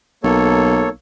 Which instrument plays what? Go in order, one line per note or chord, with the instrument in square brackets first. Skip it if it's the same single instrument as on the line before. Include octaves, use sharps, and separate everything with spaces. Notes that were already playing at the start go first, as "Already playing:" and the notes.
[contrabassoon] B1 [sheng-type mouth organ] A#3 A4 C#5